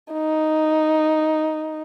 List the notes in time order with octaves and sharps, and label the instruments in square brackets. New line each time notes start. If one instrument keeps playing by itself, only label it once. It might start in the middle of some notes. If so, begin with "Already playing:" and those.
[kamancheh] D#4